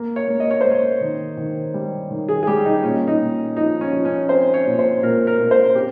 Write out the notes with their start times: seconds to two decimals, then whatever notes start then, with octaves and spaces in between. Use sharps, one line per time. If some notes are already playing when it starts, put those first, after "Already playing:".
Already playing: A#3
0.16 C#5
0.28 A#3
0.40 D#5
0.51 C#5
0.61 A#3 C5
0.72 C#5
1.01 D#3
1.37 D#3
1.74 G3
2.11 D#3
2.28 G#4
2.43 G#4
2.47 G3 G4
2.65 D#4
2.83 A#2 C#4
3.07 D#4
3.20 A#2
3.57 F3 D#4
3.81 C#4
3.93 F3
4.05 C#4
4.29 C4 C5
4.54 C#5
4.67 A#2
4.79 C5
5.02 A#2 A#4
5.27 A#4
5.39 A#2
5.51 C5
5.75 C4 G4